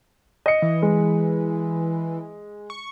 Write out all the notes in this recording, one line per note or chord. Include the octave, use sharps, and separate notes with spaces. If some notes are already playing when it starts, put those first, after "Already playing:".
D#5 C#7
E3
G#3
C#6